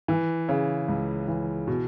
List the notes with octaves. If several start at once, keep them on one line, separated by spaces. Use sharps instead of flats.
E3
C#3
C#2
E3
B2